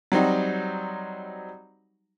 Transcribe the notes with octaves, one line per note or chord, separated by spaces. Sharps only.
F#3 G3 C4 D#4 F#4